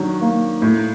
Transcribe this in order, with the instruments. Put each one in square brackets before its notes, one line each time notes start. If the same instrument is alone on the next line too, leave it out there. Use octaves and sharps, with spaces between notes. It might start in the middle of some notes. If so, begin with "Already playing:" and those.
Already playing: [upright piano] D#3 F#3 D4
A#3
A2